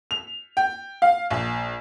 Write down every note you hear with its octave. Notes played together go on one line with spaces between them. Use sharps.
F7
G5
F5
A#1